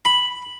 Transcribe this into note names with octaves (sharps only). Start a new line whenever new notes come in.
B5